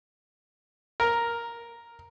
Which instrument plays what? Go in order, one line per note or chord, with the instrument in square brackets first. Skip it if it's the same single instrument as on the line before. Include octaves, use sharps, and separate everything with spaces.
[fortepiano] A#4